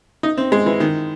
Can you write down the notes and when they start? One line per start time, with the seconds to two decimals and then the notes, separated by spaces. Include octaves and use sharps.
0.23 D#4
0.37 C4
0.52 G#3
0.66 E3
0.80 D#3